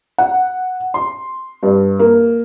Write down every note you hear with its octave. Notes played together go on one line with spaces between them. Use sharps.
F#5
C6
G2
A#3